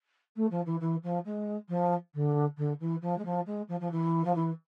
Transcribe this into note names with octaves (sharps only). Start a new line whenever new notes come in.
A3
F3
E3
E3
F3
G#3
F3
D3
D3
E3
F3
G#3
F3
G#3
F3
F3
E3
F3
E3